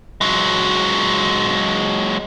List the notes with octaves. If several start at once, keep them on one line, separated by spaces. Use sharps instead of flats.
F#3 G#3